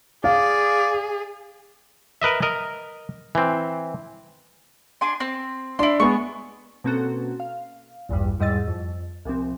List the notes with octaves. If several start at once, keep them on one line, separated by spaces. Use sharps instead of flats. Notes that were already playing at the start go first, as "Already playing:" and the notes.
G#4 D5 F5
A#4 B4 D#5 E5
A#4 D#5
E3 C4
D4 G#5 C6
C4
D4 E4 C6
G#3 B3 C#6
B2 A#3 C4 C#4 F#4 A4
F5
A#1 E2 G2 G3
E2 G#2 G3 D#5 E6 A6
F2
C2 A#2 F3 C4